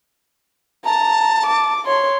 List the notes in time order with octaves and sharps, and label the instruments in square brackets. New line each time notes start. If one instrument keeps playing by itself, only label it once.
[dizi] A5 [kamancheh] A#5
[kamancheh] D6
C#5 C6